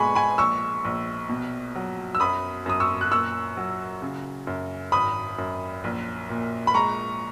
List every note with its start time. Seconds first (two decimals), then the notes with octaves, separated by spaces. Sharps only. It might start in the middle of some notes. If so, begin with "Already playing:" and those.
Already playing: B2 G#3 G#5 B5 C#6
0.15 G#5 B5
0.38 A#1 C#6 E6
0.85 A#1
1.29 B2
1.75 F#3
2.15 E6
2.20 F#2 B5 D#6
2.66 F#2 D#6
2.80 C#6 E6
3.01 F#6
3.11 A#2 C#6 E6
3.57 F#3
4.02 C#3
4.47 F#2
4.92 G#1 B5 D#6
5.38 F#2
5.84 A#1
6.29 A#2
6.67 B5
6.74 G#3 A#5 C#6